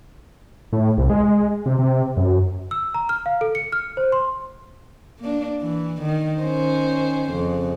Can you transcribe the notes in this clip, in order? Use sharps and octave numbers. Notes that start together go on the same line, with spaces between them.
A2
C2
G#3
C3
C3
F#2
E6
A#5
F6
F5
A4
C#7
F6
C5
C6
A#3 D4
E3
D#3
D#3 C#4 C5
F2 C#3